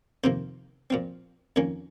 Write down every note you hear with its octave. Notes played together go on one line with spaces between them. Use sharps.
F2 C3 D#3 A#3 C5
A#2 F3 C4
F2 D#3 A#3 C#4